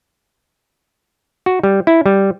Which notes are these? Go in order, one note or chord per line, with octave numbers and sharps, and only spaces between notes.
F#4
G3
E4
G3